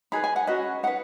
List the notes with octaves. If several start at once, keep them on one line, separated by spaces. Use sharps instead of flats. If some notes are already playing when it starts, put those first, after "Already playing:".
D#4 G#4 B4 B5
G#5
F#5
C#4 F#4 B4 D#5
D#4 B4 F#5